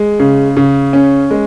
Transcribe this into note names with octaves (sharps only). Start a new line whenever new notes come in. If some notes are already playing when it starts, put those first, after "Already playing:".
Already playing: G#3
C#3
C#3
C#4
G#3